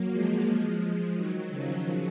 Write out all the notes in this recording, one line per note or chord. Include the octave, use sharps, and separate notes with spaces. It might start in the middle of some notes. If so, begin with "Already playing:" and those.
Already playing: F#3 A#3
F3 G#3
F3 G#3
F3 G#3
D#3 F#3
C#3 F3